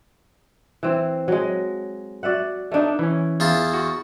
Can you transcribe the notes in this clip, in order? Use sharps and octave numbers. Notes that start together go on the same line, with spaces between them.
E3 C4
F#3 G#3
F#4 D5 E5 F#5
A3 B3 D4 D#4
E3 C#4
E2 F4 A5
F#4